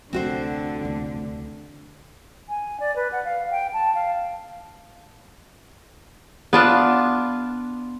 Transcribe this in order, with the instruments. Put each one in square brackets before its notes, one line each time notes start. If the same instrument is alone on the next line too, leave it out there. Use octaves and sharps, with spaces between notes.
[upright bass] F1 D2 [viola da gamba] D3 [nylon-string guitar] C4 F#4 C5
[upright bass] F1 D2
[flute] G#5
D5
B4
F#5
F5
G5
A5
F5
[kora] B3 D4 F4